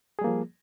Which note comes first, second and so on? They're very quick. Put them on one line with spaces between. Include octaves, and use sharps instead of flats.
G#4 G3 A#3 F3